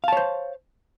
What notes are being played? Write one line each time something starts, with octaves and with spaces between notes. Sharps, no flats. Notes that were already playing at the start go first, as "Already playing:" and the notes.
C5 C#5 F5 A5